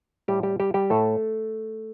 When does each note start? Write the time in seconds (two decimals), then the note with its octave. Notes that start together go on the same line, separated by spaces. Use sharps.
0.28 A2 G3 G4
0.43 G3 G4
0.60 G3 G4
0.74 G3 G4
0.90 A2 A3 A4